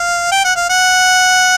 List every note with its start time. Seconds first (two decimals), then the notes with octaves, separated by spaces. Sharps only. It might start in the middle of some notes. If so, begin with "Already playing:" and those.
Already playing: F5
0.32 G5
0.45 F#5
0.56 F5
0.70 F#5